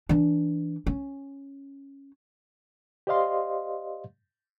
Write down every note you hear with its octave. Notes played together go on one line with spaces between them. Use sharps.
E3 D4
C#4
G4 C5 D5 D#5 F5 C6